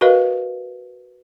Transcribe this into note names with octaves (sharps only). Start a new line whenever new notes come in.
F#4 A#4 B4 D#5 F5